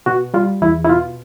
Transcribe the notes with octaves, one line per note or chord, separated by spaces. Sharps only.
B2 F#4
G3 F4
E2 E4
E4
B2 F4